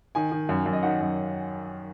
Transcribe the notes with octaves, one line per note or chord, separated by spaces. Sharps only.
D#3 G#5
D#3
F#2
F#2
D#5
D#3 F#5
F#2